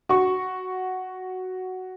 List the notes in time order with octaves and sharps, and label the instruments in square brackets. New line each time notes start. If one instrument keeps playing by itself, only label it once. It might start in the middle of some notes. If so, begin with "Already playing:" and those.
[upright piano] F#4 C#6